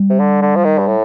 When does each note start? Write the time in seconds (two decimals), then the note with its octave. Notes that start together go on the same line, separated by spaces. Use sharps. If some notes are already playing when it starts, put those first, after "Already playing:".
Already playing: G3
0.10 C3
0.20 D3
0.42 D3
0.56 F3
0.64 D#3
0.79 G2
0.87 A2